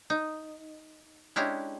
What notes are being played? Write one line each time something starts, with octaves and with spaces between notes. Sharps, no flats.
D#4
G#3 C#4 D4 E4 G4 A#5